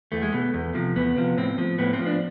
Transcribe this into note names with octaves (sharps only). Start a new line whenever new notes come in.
E2 A3
G#3
B2 A3
E2
C3 F3
E2 B3
C3 F3
A2 C4
F3
A2 B3
C4
F3
D4